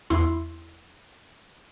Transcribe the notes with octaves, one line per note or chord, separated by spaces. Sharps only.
E2 E4 C6